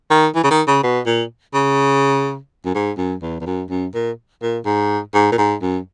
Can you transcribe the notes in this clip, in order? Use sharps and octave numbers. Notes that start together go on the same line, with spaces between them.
D#3
E3
C#3
D#3
C#3
B2
A#2
C#3
F#2
G#2
F#2
E2
E2
F#2
F#2
A#2
A#2
G#2
G#2
A#2
G#2
F#2